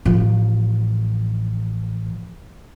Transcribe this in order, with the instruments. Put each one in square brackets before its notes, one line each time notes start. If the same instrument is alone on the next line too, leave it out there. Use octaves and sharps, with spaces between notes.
[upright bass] A1 F3